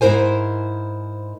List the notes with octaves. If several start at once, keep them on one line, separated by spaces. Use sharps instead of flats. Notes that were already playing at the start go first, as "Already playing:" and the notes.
G#2 E4 A#4 C5 G#5